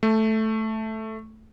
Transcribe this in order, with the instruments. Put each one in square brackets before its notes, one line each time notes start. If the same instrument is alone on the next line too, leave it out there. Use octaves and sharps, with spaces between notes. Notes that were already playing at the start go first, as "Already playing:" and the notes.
[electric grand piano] A3